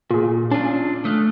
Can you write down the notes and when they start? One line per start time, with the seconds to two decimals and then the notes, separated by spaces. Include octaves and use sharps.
0.11 A#2 F4 G#4
0.51 C#4 D4 F4
1.05 A3 D#6 F6 F#6